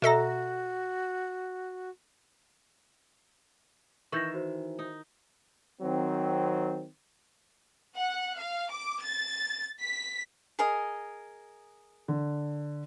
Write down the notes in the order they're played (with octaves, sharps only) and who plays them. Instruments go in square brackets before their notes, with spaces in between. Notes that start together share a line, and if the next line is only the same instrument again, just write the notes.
[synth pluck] B2 A4 A#6 [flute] F#4 [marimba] E5 A#5
[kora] D#3 E3 E5 [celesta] C#6 G6 A#6
[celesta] F#4 C5
[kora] D#4
[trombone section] D#3 F#3 C4
[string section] F#5
F5
D6
A6
B6
[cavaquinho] G#4 A#4 D#5
[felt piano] D3